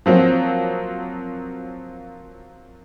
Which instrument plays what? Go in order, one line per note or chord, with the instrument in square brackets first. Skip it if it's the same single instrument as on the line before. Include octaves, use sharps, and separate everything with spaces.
[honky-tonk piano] F3 F#3 A#3 C4